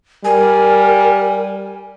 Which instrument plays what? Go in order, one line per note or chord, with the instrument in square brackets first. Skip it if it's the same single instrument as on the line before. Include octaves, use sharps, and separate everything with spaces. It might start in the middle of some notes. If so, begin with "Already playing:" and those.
[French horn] G3 [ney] A#4 [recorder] G#5